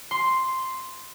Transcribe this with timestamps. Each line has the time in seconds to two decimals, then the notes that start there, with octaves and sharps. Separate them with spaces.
0.11 C6